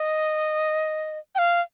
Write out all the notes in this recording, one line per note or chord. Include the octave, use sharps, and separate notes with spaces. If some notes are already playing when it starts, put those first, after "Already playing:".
Already playing: D#5
G5
F5